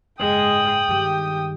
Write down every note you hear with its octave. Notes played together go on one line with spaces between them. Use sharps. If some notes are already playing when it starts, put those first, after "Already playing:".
F#1 G#2 G#3 G5 D#6 F#7
G2 D#3 G4